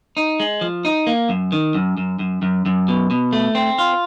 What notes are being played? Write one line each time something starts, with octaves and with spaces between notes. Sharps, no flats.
D#4
G#3
F3
D#4
A#3
F#2
D#3
F#2
F#2
F#2
F#2
F#2
B2
B2
A3
C4
F4